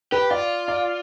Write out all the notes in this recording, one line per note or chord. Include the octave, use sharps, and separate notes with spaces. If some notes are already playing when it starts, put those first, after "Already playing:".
G4 B4
F4 D5
D5